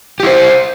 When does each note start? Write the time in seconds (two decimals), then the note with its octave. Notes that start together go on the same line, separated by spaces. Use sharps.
0.20 G4
0.23 E4
0.27 C5